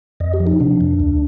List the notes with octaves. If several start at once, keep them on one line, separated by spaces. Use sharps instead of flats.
F2 D#5
G4
F3
D#4
C3 D4
F2
D2